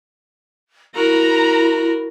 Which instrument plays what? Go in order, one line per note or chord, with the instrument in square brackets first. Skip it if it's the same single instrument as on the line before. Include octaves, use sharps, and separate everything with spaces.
[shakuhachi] E4 [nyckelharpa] F#4 A#4 [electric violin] A#5 B5